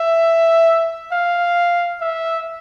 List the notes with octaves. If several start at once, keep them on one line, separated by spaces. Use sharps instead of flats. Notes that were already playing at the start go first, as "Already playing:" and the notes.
Already playing: E5
F5
E5